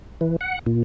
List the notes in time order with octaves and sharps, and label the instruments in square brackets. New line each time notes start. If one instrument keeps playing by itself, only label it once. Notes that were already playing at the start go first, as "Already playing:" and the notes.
[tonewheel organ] E3
F#5
A#2